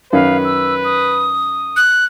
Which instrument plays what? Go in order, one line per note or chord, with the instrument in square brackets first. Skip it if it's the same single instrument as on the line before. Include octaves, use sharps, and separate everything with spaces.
[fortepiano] F#2 D#3 C#4 [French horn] B4 [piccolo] F5
[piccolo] E6
D#6
[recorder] F#6